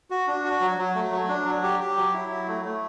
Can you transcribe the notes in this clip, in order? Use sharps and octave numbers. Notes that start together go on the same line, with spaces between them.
F#4
D4
F#4
F#3
F#3
A3
F#3
D4
F#3
G4
G4
F#3
E4
F#3
A3
A3